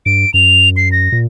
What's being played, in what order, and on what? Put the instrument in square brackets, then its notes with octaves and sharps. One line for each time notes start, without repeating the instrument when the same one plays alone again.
[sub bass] G2 [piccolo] D7
[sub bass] F#2 [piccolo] F7
[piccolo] C7
A#6
[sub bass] A#2